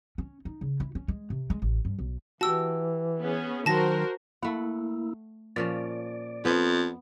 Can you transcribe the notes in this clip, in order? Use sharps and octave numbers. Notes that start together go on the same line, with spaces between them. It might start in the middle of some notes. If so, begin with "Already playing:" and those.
C#4
D#4
C#3
E4
C#4
G#3
C3
G#3
A1
G2
B1
E3 F#4 G4 A5 E6
B3 C#4 G#4
D#3 F#3 F#4 A#4 C5 A5 A#6
A3 A#3 E4 F#5
A#2 F3 C#4 D5
F2 B3